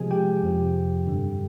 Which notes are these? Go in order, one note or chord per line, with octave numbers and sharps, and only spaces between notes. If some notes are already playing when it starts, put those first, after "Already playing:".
Already playing: C3 F3 G#3 G#4 G#5
G4 G5
F2 C3 F3
G2 D3 G3